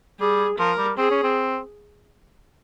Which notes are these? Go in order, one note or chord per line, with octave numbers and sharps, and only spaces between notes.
G3 G#4
F3 A#4
G3
C4 G#4
C#4
C4